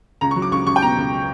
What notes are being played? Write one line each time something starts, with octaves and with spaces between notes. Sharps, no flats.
C#2 A#5
C#6
F#3
D6
C#2 C#6
C#2 C#6
G5
B2 A#5
C#2